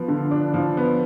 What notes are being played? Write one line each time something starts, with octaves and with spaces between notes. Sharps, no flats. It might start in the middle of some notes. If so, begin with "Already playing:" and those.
Already playing: F3 B3
D3
D4
F3
B3